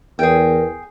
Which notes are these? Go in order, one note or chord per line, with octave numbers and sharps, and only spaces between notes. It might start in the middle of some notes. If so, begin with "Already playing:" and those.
E2 G#4 A#4 G5